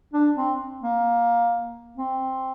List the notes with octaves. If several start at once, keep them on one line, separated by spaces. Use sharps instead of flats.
D4
C4
A#3
C4